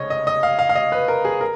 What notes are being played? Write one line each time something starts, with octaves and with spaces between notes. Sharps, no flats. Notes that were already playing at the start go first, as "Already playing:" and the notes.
Already playing: F1 F2 C#3 G#3 C#5 D#5
D#5
D#5
F5
F5
F5
D#5
B4
A#4
G#4
A#4